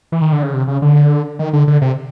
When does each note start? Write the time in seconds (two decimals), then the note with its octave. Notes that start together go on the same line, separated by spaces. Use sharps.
0.12 E3
0.22 D#3
0.32 D3
0.43 C#3
0.53 C3
0.68 C#3
0.82 D3
1.39 D#3
1.53 D3
1.68 D3
1.82 C3